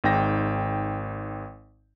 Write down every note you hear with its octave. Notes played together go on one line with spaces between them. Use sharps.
G#1 G#2 G5 A#6